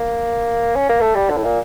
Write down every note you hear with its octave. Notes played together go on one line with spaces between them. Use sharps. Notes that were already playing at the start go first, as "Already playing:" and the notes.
Already playing: A#3
C#4
A#3
A3
G3
D3
A2
A#2